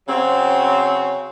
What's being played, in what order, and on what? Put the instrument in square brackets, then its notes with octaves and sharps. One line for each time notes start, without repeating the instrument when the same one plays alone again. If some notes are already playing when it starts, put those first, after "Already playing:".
[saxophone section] C#3 F#3 C4